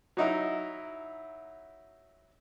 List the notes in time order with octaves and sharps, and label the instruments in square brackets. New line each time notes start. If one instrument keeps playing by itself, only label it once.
[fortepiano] F#3 D#4 E4